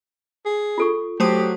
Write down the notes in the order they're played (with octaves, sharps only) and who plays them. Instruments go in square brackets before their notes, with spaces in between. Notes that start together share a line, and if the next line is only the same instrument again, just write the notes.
[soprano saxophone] G#4
[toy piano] F4 A4 C#6
[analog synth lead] F#3 [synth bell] A3 C5 D#6 [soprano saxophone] G4